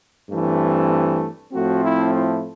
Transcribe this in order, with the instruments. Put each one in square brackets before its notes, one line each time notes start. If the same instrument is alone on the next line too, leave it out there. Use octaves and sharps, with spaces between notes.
[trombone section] G2 E3 A3 C4
A2 F3 A3 C4 F#4
E4
E4